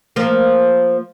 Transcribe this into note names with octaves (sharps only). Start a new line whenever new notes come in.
F3 A#3